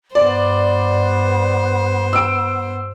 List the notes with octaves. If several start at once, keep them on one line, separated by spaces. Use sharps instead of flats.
G2 B3 C5 D5
E6 D7